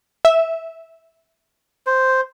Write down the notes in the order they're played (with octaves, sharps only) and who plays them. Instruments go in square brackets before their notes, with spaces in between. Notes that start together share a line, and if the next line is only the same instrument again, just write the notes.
[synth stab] E5
[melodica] C5